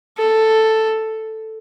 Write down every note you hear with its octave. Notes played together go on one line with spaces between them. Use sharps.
A4